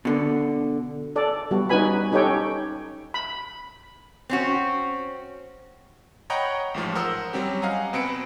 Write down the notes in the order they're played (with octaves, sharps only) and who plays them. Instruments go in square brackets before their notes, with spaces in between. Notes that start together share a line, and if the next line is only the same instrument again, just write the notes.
[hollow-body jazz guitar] B2 D3
[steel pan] A4 D5
G3 B3 F#4
C#4 D#4 F#4 B4 G#5 B5
C#4 D#4 G4 A4 C#5 G5
B5
[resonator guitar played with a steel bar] C4 C#4 F#4
[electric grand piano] C#5 D#5 F#5 G5 A#5 B5
A1 G#2 F3
A#4 C5 F#5 C6 D#6 E6
F#3 G3 C4 C#4 G4
D#5 F5 F#5 G#5 A#5
B2 C4 B4 C#7 D7